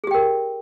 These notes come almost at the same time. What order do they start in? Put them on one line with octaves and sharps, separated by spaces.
G#4 G4 G5 A#4